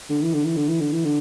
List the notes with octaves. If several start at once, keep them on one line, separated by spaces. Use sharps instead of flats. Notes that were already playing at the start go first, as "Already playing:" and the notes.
D3
E3
D3
E3
D3
E3
D3
E3
D3